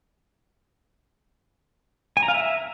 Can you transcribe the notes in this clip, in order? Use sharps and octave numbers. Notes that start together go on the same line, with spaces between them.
G#5
A#5
F5
E5